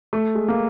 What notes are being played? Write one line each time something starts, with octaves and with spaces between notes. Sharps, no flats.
A3
G#3
A#3